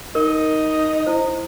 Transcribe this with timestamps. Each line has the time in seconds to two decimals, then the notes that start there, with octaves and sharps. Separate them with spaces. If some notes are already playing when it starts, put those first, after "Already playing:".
0.15 D#4 A#4 D#5
1.06 E4 C5